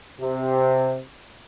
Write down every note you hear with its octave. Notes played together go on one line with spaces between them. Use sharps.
C3